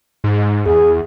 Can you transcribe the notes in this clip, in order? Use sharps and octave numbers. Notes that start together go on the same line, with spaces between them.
G#2
E2 G#4